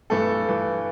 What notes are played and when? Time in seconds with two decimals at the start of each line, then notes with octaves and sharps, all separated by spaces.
0.10 G2 E3 A3 A4
0.48 G2 E3